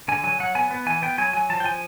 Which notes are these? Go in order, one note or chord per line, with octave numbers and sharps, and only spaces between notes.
D3 G#5
F#3 G#5
F#3 F#5
B3 G#5
B3
E3 G#5
B3 G5
F#3 G#5
F#3 G#5
F3 A5
G5
F3 G#5